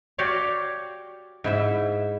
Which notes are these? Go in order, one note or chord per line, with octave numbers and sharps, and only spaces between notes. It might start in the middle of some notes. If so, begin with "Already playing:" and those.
F#4 G4 C#5 D5 F5
G#2 E4 E5